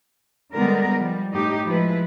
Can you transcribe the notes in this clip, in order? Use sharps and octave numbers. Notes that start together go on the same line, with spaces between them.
D3 G3 G#3 B3 A#4
F3 G3
A2 D#4 G4
F3 G#3 E4 B4